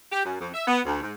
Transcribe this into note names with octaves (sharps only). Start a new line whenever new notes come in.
G4
F#2
F2
E5
B3
D2
G#2